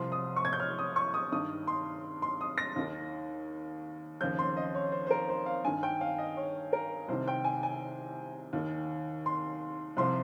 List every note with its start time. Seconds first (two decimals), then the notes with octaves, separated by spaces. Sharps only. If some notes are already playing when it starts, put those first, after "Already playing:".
Already playing: C2 C3 F3 C6
0.12 D#6
0.36 C#6
0.45 G#6
0.53 G6
0.60 F6
0.79 D#6
0.96 C#6
1.14 D#6
1.32 G2 D#3 D#6
1.67 C6
2.22 C6
2.41 D#6
2.58 A#6
2.76 D#2 D#3
4.21 D#2 C#3 F3 G6
4.39 C6
4.57 D#5
4.75 C#5
4.92 C5
5.07 C5
5.11 A#4
5.29 C5
5.46 F5
5.64 G2 D#3 G#5
5.83 G5
6.01 F5
6.18 D#5
6.37 C#5
6.73 A#4
7.08 C2 C3 D#3 C5
7.28 G5
7.44 G#5
7.63 G#5
8.53 D#2 D#3
9.26 C6
9.97 C2 C3 F3 C6